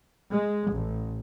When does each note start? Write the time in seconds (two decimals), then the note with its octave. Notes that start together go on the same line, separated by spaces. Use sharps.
0.31 G#3
0.72 A1